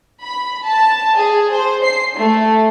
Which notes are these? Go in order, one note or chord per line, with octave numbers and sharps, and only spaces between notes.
B5
A5
G#4
C5
C7
A3